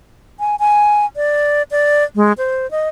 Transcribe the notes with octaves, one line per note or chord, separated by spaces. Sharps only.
G#5
G#5
D5
D5
G#3
C5
D#5